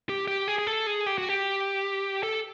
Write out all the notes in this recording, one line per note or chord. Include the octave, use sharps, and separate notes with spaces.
G4
G4
G#4
G#4
A4
G#4
G4
F#4
G4
A4